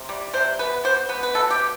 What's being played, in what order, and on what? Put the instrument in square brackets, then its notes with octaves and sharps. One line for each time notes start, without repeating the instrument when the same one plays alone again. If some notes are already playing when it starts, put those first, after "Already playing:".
Already playing: [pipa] C3
G3
C3 C5
B3 B4
B3 C5
B3 B4
B4
B2 A4
G4
B2